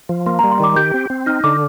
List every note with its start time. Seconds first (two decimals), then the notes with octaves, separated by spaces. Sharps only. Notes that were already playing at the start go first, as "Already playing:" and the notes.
0.09 F3
0.26 A#3 C6
0.39 A#5
0.44 G3
0.52 C6
0.60 D#3 D6
0.76 G4 G6
0.94 C4
1.10 C4
1.26 D#4 F6
1.44 D3 D6